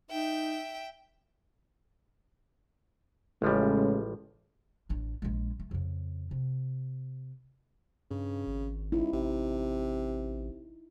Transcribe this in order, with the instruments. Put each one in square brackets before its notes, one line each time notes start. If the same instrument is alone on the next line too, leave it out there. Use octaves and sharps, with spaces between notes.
[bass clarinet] D#4 [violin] E5 G5
[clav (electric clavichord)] A1 F3 G3 [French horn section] A2 C#3 G#3
[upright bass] A1 D4
A#1 G#3
A3
F2 C#3
C3
[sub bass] G2 [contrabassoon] C#3
[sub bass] G#1
[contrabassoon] C#2 [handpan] D#4 E4
[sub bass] A1 [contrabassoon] C3